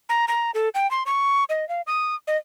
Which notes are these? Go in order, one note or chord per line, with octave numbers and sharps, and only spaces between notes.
A#5
A#5
A4
G5
C6
C#6
D#5
F5
D#6
D#5